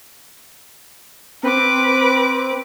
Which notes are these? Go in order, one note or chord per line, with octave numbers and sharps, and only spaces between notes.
C4 B4 D6